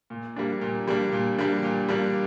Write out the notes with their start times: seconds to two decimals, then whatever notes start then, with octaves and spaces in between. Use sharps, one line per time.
0.10 A#2
0.36 G3 A#3 D4
0.61 A#2
0.87 G3 A#3 D4
1.12 A#2
1.38 G3 A#3 D4
1.63 A#2
1.89 G3 A#3 D4